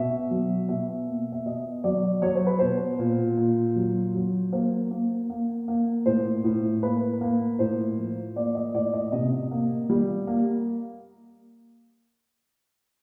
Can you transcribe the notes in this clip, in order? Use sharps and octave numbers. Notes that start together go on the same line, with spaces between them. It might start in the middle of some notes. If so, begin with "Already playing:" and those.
Already playing: B2 E5
F#3
B2 E5
A#3
E5
B2 D#5
F#3 D5
F#3 C#5
C5
B4
B2 C5
A#2
A#2
F#3
F#3
A#3 C5
A#3
A#3
A#3
A2 C5
A2
A#3 B4
A#3
A2 C5
F3
A#3 D5
D#5
A2 D5
D#5
C3 D#5
A#3
G3
A#3